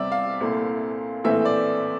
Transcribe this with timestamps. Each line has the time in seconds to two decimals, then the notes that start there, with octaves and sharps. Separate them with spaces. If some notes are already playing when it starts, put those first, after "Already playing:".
Already playing: E2 C3 G3 D5 E5
0.12 F5
0.41 C2 A#2 A3 C4
1.24 A#1 A2 E3 A3 C4 E5
1.45 D5